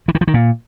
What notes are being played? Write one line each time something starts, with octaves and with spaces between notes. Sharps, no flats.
E3
D#3
F3
D#3
A#2